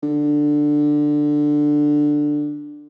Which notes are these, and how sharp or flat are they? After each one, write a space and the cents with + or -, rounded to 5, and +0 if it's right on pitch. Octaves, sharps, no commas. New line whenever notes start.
D3 +10